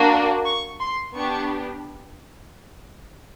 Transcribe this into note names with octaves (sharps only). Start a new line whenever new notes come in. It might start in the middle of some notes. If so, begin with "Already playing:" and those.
Already playing: A#3 D4 F#4
C#6
C6
B3 D4 G4 C#6